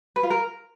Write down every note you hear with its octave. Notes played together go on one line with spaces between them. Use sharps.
B4
F4
A#4